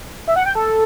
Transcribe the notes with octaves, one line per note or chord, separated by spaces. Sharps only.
E5
F#5
G5
A4